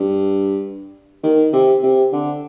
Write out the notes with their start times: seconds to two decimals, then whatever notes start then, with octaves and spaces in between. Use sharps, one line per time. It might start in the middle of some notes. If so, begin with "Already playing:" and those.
Already playing: G2
1.23 D#3
1.53 C3
1.83 C3
2.12 D3